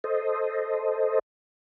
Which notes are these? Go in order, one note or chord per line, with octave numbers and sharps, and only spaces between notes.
A4 C5 D#5